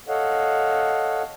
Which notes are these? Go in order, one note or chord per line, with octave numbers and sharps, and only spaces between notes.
A4 C#5 D#5 F5 F#5